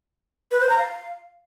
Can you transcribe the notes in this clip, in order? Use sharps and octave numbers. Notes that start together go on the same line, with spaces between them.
B4
C5
A#5
F5